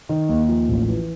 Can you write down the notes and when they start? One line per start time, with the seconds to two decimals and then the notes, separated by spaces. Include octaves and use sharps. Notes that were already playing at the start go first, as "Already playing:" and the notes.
0.09 D#3
0.29 D#2
0.48 F3
0.69 A1
0.88 E3